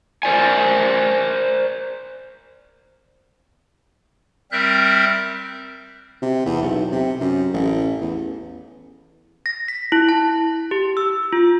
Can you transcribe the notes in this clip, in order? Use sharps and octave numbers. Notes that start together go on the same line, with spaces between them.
A#4 C5 D5 G#5
G3 C4 A#4 E5 F#6 G6
C3
E2
B1
C3
F#2
A1
E2
A#6
B6
E4
A5
G4
E6
F4